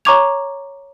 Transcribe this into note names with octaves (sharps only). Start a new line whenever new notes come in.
C#5 A#5 C#6 D6 G#6 F7